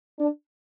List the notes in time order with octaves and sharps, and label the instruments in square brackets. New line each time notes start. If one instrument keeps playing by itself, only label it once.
[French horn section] D4